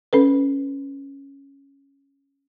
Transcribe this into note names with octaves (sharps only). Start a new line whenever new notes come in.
C#4 A4 B4